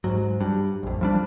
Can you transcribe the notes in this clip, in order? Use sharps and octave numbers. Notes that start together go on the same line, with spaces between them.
G#2 F#3
G2
A#1 F2
F3 G3 D4